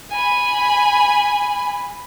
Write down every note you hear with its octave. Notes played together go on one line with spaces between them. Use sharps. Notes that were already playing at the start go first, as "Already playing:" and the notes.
G#5 B5